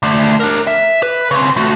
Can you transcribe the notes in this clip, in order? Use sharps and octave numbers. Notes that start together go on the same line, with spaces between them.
D3 A3
D4 A#4
E5
B4
C#3 C4
A3 F#4